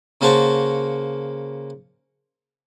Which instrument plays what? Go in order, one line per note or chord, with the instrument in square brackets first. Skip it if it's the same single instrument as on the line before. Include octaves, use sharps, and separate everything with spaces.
[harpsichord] C#3 A#3 F#4 C5 A5 C#6